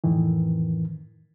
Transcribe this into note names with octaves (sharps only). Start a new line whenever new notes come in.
F2 A2 D#3 E3